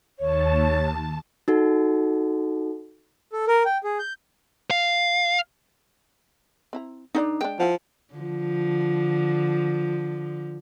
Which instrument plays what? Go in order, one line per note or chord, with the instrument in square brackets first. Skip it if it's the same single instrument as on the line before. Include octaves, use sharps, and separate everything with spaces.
[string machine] D#2 A5 [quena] C#5
[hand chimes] D#4 F#4 A4
[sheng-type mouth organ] A4
A#4
G5
G#4
G6
[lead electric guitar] F5
[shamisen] C4 E4 A#5
[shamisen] D3 G4 D5 [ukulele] D4 D#4
[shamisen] G#3 D4 [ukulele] G5
[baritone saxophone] F3 [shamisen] E4 F#5
[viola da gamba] D3 F3